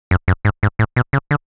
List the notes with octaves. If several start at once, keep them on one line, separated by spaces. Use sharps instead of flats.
F#2
F#2
G#2
G#2
A2
B2
C#3
D3